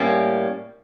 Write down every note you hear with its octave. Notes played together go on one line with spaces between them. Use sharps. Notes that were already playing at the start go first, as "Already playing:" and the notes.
Already playing: A2 G3 A#3 C#4